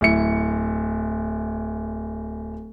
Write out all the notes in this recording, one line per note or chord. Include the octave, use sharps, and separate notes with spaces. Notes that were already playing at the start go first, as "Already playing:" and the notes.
D1 E4 C#7